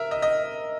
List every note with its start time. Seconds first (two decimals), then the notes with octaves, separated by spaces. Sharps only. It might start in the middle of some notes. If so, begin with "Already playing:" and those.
Already playing: A#4 E5
0.11 D#5
0.22 D#5